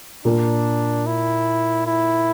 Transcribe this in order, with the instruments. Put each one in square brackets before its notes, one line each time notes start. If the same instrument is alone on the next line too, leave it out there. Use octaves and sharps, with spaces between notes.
[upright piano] A#2 A#3 [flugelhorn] D4
[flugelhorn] E4
E4